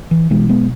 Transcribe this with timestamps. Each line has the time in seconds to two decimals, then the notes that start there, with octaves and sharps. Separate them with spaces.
0.11 E3
0.30 B1 B2 E3 G#3
0.49 G#3 B3